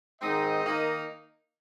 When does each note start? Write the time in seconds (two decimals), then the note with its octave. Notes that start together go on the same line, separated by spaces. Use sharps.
0.20 G#2 D#3 C4 D#4 D#5
0.62 D#3 A#3 D#4